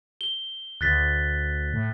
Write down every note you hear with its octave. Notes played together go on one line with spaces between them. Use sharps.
G7
D2 F#6 A6 B6
A2